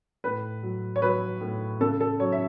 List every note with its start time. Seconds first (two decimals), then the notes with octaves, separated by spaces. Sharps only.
0.24 A2 B4
0.63 F#3
0.96 C#5
1.02 F#3 B4
1.41 A2
1.80 C#3 A4
2.01 A4
2.20 F#3 C#5
2.32 E5